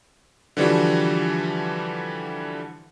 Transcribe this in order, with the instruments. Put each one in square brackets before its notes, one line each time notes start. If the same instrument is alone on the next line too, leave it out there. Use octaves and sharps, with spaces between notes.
[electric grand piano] D3 E3 F3 G3 F#4